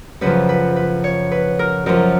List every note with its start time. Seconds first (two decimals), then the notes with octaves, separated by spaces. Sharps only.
0.21 F#2 C#3 F3 B4
0.49 B4
0.76 B4
1.04 C#5
1.32 B4
1.59 A#4
1.86 F#2 F3 A#4